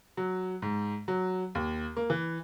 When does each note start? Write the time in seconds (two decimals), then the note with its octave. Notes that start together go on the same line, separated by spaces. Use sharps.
0.17 F#3
0.62 G#2
1.08 F#3
1.55 D#2
1.97 A#3
2.10 E3